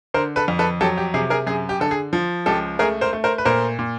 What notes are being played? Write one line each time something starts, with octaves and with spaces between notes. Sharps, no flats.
D3 A#4 C5
A4 B4
F2
A4 B4
F#3 G4 A4
G4
C3 G#4
G#4 A#4
F#2 G#4
G4
D3 A4
G#4
F3
C#2 G4 A4
A3 G#4 A#4
A#4 C5
A3
A#4 C5
B4
A#2 A#4 C5
A#2